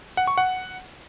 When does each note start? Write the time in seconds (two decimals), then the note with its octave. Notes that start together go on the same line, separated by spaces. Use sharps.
0.17 F#5
0.27 C#6
0.38 F#5